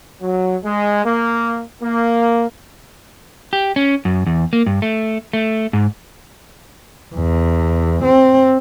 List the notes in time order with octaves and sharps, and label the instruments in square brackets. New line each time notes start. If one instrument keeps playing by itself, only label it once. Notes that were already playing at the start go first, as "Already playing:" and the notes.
[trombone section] F#3
G#3
A#3
A#3
[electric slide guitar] G4
C#4
F#2
E2
A#3
G2
A3
A3
G#2
[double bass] E2
C4